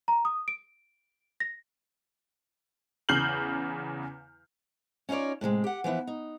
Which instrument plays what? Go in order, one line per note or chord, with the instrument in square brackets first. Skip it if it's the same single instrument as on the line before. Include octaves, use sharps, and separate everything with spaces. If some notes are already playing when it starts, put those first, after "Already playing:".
[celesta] A#5
D#6
D7
A#6
[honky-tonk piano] E2 C#3 F6 G6 C7 F#7
[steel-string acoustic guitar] C#4 D#4 F4 C#5 D5
A2 C3 F#3 G#3
G4 F#5
E3 F3 B3 E4
D#4